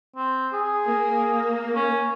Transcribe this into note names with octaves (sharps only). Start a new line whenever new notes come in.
C4
G#4
A#3
C#4